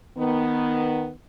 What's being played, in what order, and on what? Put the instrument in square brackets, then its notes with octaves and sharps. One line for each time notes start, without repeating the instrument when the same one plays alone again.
[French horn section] D#3 B3